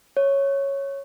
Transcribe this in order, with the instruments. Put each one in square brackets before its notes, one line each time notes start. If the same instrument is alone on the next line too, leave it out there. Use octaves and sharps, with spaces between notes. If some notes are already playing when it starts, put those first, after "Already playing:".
[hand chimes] C#5